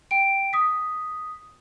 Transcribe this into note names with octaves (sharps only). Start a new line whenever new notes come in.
G5 D7
D#6 B6